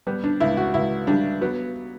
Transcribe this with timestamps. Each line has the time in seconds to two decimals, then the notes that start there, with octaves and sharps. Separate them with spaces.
0.07 G3 B3
0.24 D4
0.40 C#2 E4
0.57 F#4
0.74 C#2 E4
1.07 G3 D4
1.41 F#3 B3